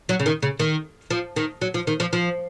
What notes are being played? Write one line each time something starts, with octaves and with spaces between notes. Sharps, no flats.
F#3
C#3
D#3
C#3
D#3
F3
D#3
F#3
F3
D#3
F3
F3